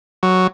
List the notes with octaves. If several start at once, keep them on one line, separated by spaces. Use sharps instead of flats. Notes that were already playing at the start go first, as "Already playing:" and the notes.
F#3